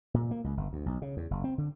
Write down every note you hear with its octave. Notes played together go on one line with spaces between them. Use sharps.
A#2
A#3
C#2
G1
D2
B1
C#3
E2
F#1
C4
D3